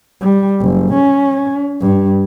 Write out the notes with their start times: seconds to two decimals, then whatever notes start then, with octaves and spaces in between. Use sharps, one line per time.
0.21 G3
0.60 F#1
0.93 C#4
1.81 G2